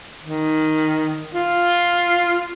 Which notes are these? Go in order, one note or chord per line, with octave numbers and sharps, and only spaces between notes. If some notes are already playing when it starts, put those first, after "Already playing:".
D#3
F4